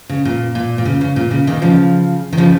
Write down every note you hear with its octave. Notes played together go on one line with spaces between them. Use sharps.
C#3
A#2
A#2
A#2
C#3
C#3
A#2
C#3
A#2 D#3
C#3 F3
D#3
C#3 F3